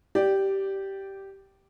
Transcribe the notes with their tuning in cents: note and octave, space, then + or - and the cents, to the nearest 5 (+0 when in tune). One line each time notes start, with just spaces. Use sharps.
G4 -10 D5 +0